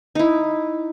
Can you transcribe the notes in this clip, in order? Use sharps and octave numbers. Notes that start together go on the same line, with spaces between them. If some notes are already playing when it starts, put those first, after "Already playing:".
D#4 E4